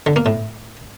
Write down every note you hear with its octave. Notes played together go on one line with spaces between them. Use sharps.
D3
A#3
A2